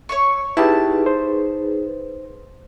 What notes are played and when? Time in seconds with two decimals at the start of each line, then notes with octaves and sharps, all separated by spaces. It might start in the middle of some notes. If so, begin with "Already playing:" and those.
0.09 C#5 E5 C#6
0.57 D#4 E4 G4 G#4 B4 A5
1.06 C5